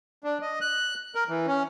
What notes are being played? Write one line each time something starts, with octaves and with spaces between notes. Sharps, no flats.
D4
D#5
F#6
A#4
E3
C#4